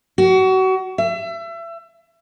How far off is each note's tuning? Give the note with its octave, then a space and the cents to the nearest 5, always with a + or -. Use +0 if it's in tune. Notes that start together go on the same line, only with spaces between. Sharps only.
F#4 +30
E5 +30